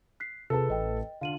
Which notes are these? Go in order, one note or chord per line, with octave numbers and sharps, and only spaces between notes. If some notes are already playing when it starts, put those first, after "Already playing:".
F#6 B6 C7
C3 F4 G#4 A4 B4 A5
A1 D#5 G5
D3 F4 F5 D#7 F#7